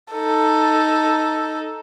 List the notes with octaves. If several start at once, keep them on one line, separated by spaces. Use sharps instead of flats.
D#4 A4